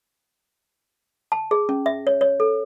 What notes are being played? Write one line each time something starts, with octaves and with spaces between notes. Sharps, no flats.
A5
G#4
C#4
E5
C#5
C#5
A4